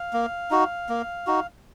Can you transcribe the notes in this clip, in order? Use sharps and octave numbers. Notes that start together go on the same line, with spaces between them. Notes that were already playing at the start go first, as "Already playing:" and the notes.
Already playing: F5
A#3
D#4 F#4
A#3
D#4 F#4